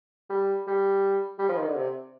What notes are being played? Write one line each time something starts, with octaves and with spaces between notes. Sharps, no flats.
G3
G3
G3
F3
D#3
D3
C3